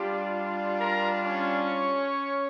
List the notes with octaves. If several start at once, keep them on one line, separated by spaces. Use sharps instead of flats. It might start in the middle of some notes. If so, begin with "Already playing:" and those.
Already playing: G3 D4 F4 G4
A#4 A#5
C#4 C#5